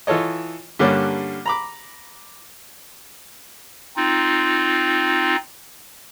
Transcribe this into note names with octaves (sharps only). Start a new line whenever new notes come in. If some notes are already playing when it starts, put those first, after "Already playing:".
E3 F4 A4 C#5 D#5
G2 D3 G3 A#3 C#4 D4
A#5 B5 D6
C4 D#4 F4